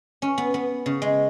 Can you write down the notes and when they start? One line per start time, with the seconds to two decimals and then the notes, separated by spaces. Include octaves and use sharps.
0.22 C#4
0.38 B3
0.54 B3
0.86 C#3
1.02 G#3